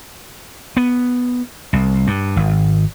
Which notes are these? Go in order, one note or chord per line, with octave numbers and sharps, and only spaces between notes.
B3
C2
G2
G#1